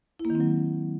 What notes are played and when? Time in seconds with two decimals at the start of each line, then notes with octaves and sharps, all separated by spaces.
0.19 E4
0.25 A#3
0.30 D#3
0.35 C4
0.40 F#3